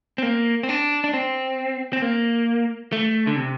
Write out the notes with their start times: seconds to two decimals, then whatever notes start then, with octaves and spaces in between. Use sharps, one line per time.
0.18 C4
0.23 A#3
0.63 C4
0.69 D4
1.04 D4
1.13 C4
1.93 C4
2.02 A#3
2.92 A3
3.27 D3
3.36 C3